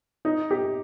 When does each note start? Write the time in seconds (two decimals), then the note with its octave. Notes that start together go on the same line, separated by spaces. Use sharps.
0.25 D#4
0.51 G4